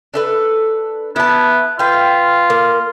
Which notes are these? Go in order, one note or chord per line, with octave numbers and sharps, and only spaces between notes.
D4 A4 B4
B3 E4 A5
F4 B4 G5
A#3